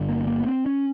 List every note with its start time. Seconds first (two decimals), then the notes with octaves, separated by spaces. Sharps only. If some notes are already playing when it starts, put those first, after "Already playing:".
Already playing: G1 G2 D3
0.09 A#3
0.27 A#3
0.40 B3
0.46 C4
0.66 C#4